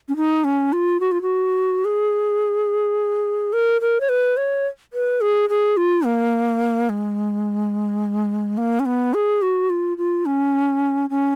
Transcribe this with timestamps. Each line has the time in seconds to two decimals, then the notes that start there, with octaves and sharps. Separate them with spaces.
0.09 C#4
0.17 D#4
0.44 C#4
0.73 F4
1.00 F#4
1.12 F4
1.22 F#4
1.85 G#4
3.53 A#4
3.81 A#4
4.00 C#5
4.09 B4
4.37 C#5
4.93 B4
5.21 G#4
5.49 G#4
5.77 F4
6.05 A#3
6.89 G#3
8.57 A#3
8.80 C#4
8.86 B3
9.14 G#4
9.42 F#4
9.70 F4
9.98 F4
10.26 C#4
11.10 C#4